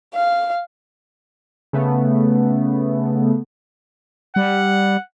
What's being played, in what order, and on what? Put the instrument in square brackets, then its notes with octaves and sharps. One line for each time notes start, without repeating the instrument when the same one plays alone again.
[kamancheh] F5
[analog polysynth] C#3 A3 B3
[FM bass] G3 [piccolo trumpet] F#5